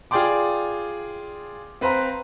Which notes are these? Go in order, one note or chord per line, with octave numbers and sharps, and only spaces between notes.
F4 G#4 D5 G5 C6 D6
C4 B4 C5 F5 A#5